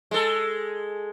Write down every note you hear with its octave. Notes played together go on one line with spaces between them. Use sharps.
G#3 A4